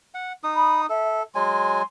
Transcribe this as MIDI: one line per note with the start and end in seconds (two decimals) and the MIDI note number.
0.14 0.33 78
0.44 0.86 63
0.44 0.86 87
0.56 0.81 83
0.89 1.23 69
0.89 1.21 76
1.35 1.82 54
1.35 1.82 56
1.35 1.82 80
1.35 1.85 84